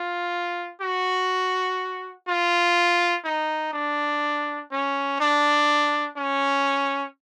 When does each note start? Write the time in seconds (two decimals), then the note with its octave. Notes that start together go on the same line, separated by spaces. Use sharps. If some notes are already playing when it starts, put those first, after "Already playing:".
Already playing: F4
0.82 F#4
2.28 F4
3.25 D#4
3.73 D4
4.72 C#4
5.20 D4
6.17 C#4